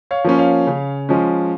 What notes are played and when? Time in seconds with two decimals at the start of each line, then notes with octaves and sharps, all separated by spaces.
0.11 C#5 F5
0.25 F3 A#3 C#4
0.39 C#5 F5
0.67 C#3
1.09 F3 G#3 C#4